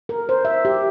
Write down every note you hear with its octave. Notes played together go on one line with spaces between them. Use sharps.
A#4
C5
E5
G4